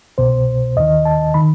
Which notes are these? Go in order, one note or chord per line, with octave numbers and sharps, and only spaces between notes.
C2 B2 C5
D#2 D#3 D#5
A5
D#3 B5